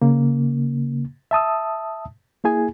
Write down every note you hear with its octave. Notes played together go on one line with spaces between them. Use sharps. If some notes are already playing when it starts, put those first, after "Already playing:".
C#3 A#3
E5 A5 D#6 E6
A#3 E4 G#4 G#5